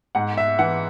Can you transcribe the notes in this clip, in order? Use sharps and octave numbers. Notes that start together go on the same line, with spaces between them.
G#2 F#5
E5
E3 F#5